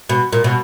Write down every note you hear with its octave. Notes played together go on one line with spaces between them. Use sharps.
B2
A#2
B2